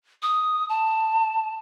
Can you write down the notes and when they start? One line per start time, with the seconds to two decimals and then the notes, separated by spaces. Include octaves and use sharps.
0.23 D#6
0.69 A5